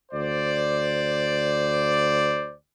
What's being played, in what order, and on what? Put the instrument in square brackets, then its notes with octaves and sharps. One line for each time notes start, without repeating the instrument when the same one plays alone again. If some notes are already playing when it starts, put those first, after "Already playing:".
[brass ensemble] D2 C5 D5